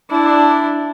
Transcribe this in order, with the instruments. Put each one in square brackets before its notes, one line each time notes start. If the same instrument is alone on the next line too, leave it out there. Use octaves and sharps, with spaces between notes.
[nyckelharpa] D4 E4